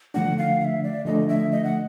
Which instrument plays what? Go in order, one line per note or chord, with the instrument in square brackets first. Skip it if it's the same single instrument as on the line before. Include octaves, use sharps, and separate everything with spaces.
[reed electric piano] D3 F3 A3 D4 [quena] F#5
[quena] F5
F5
E5
D5
[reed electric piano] D3 F3 A3 D4 [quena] D#5
[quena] E5
D#5
F#5